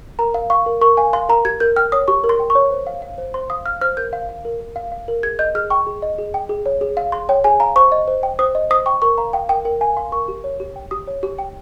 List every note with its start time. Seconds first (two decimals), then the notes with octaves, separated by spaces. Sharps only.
0.19 A#4 A#5
0.34 F5
0.50 F5 C#6
0.66 A#4
0.81 A#4 C#6
0.97 F5 G#5
1.13 F5 C6
1.29 A#4 A#5
1.45 G4 G#6
1.60 A#4 G6
1.76 G5 F6
1.92 C#5 D#6
2.08 G4 C#6
2.24 A#4
2.29 C6
2.40 G5
2.50 C#6
2.55 C#5
2.70 C5
2.87 F5
3.02 F5
3.18 C5
3.34 C5 C6
3.50 F5 D#6
3.66 F5 F6
3.81 C5 F6
3.97 A#4 G6
4.13 F5
4.29 F5
4.45 A#4
4.60 A#4
4.76 F5
4.92 F5
5.08 A#4
5.23 G#4 G#6
5.39 D#5 G6
5.55 G#4 F6
5.70 G5 C#6
5.87 G#4
6.02 D#5
6.18 G#4
6.34 G5
6.49 G#4
6.66 C#5
6.81 G#4
6.97 F5
7.12 G#4 C6
7.29 C#5 G5
7.44 G#4 G#5
7.60 F5 A#5
7.76 C5 C#6
7.92 D#5
8.08 C5
8.23 G5
8.39 C5 D#6
8.55 D#5
8.70 C5 D#6
8.86 G5 C#6
9.02 A#4 C#6
9.18 F5 A#5
9.33 F5 G5
9.49 A#4 G5
9.65 A#4 G5
9.81 F5 G#5
9.97 F5 C6
10.12 A#4 C#6
10.28 G4
10.44 C#5
10.60 G4
10.76 G5
10.91 G4 D#6
11.07 C#5
11.23 G4
11.39 G5